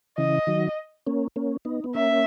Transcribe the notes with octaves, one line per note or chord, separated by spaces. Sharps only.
C#3 E3 D#5
D#3 F#3
A#3 C#4
A#3 C#4
B3 D#4
B3
A#3 C#4 E5